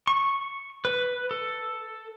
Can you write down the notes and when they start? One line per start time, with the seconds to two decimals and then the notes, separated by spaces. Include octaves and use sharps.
0.07 C#6
0.85 B4
1.31 A4